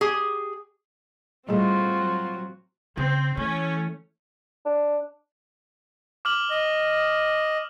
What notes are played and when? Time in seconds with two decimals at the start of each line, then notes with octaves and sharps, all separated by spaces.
0.01 G4 G#4
1.49 A2 G3 C4 F4 F#4 G#4
1.99 F#3
2.97 C#3 C4
3.37 E3 A3 C#4
4.66 D4
6.25 D6 F6 F#7
6.50 D#5